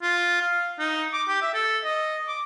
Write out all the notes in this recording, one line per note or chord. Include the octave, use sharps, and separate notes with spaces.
F4
F5
D#4
D6
G4
E5
A4
D#5
D6